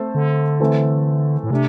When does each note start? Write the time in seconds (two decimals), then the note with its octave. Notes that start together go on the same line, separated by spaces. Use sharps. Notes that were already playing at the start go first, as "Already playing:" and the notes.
Already playing: A3 C4 A4 C5
0.15 D3
0.60 E3 A3 C4 A4
1.44 A2
1.51 C3 A3 D4